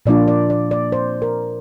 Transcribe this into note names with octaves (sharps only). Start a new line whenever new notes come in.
A#2 F3 A#3 D4 F4 D5
D5
D5
D5
C5
A#4